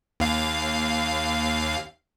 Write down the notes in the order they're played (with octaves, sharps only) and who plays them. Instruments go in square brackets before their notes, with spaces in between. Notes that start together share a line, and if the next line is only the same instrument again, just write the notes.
[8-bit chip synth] D#2 F5